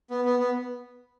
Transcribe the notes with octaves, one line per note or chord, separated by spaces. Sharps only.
B3
B3
B3